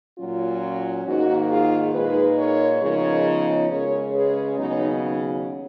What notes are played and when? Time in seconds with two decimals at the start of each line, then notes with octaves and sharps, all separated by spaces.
0.18 A#2 F#3 C#4 F4
1.05 G#2 D#3 A#3 D#4 F#4
1.50 F4 G#4
1.93 A#2 G#3 D#4 G#4 B4
2.38 A#4 C#5
2.81 C#3 F3 G#3 B3 D#4 A#4 C#5
3.69 C#3 G#3 C#4 A#4 C#5
4.13 G#4 B4
4.57 D#2 C#3 F#3 B3 D#4